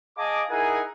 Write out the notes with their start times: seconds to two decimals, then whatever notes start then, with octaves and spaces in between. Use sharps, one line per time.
0.17 G#4 D#5 F5 A5 D6
0.50 D#4 E4 G#4 A#4 F#5 G#5